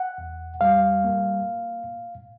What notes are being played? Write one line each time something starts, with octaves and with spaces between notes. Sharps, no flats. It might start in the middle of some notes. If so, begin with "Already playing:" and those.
Already playing: F#5
E2
G3 F5
A#3